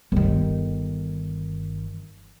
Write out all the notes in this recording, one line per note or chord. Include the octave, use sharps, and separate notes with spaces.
G1 D#3